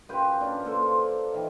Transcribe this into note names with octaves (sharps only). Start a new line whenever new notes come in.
F#2 F4 G4 B4
C#4 D4
A#3 A4 C5
F4
D#3 E3